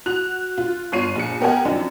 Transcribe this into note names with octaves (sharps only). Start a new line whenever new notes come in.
F#4 F#6 F7
F4
G1 F4 C#5 C7 D#7
A#1 C#7
B3 G4 A#4 D#5 F#5 G#5
F#2 D#3 F3 C4 D4 D#4